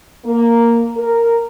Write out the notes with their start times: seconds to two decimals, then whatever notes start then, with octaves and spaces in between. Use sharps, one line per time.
0.24 A#3
0.96 A#4